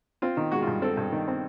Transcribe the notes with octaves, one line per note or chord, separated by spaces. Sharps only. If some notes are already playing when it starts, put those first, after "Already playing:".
C4 F4
D#3
G#3 F#4
F4
G2
C4 A4
G2
D#3
C4